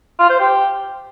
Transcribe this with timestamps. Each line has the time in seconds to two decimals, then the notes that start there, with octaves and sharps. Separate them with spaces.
0.19 F4
0.29 C5
0.40 G4